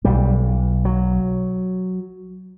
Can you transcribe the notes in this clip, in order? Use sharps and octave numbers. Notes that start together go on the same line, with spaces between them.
B1 B2 G3
F#3